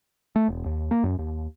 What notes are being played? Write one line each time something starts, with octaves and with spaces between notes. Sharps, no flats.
A3
E1
D#2
A#3
F#2
D#2